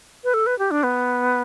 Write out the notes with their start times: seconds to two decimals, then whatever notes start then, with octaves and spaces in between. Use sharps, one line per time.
0.24 B4
0.34 A4
0.47 B4
0.59 G4
0.71 D4
0.83 B3